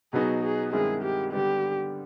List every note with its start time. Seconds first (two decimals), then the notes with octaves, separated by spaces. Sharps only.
0.13 B2 F#3 B3 D#4 F#4 G#4
0.43 G#4
0.72 G2 D#3 G#3 C4 E4 G#4
1.03 G4
1.33 D3 G3 B3 G4